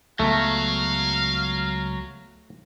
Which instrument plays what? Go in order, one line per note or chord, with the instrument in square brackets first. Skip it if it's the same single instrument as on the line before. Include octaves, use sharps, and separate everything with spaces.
[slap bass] C#2 B3 [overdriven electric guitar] F#3 [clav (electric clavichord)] A3 [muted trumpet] F5